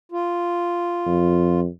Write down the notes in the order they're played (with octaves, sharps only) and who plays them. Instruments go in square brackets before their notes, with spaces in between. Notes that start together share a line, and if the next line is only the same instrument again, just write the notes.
[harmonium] F4
[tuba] F2